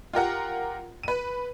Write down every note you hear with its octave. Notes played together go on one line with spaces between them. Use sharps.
F4 G4 A#4 F#5
B4 D#7